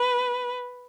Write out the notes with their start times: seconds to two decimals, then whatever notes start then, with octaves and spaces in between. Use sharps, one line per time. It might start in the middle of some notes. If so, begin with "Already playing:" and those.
Already playing: B4